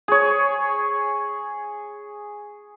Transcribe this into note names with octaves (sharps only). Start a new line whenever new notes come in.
G#4 C#5